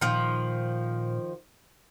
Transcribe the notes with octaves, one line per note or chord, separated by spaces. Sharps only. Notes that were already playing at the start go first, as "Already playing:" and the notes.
A#2 D#3 F3